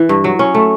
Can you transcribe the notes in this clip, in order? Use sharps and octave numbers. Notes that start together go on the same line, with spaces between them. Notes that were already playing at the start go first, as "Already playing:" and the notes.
Already playing: E3
G2
F#3
C#4
A3